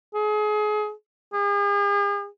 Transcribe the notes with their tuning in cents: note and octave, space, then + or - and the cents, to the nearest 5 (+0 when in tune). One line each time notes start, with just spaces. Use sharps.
G#4 +30
G#4 -45